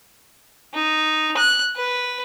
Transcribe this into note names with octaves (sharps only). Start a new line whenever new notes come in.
D#4
F#6
B4